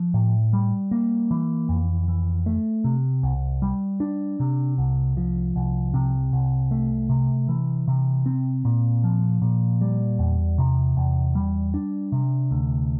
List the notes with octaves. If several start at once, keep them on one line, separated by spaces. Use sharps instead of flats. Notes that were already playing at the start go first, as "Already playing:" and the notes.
Already playing: F3
A2
G3
A#3
E3
F2
E3
A3
C3
C2
G3
D4
C3
C2
F3
C2
C3
C2
A3
C3
E3
C3
C4
A#2
F3
A#2
G3
E2
C3
E2
G3
D4
C3
D2